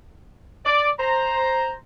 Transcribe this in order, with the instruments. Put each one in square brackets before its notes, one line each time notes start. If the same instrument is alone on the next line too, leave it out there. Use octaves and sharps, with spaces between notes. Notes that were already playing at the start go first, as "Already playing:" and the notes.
[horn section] D5
C5 A#5